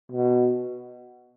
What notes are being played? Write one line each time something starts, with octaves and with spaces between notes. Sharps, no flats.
B2